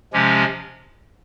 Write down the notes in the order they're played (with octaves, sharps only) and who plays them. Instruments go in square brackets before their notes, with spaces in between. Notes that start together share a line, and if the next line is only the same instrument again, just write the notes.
[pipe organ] C3 F3 G#3 C#4 G4